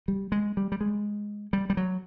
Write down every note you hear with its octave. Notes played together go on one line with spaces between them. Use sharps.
G3
G#3
G3
G3
G#3
G3
G3
F#3